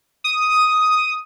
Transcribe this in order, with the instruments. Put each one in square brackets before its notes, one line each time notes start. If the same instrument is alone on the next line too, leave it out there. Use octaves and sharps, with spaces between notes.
[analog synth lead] D#6